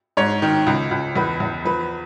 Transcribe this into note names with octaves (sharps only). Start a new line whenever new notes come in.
G#2 C#5
D#3
C#2
C#2
E2 B4
E2
F3 B4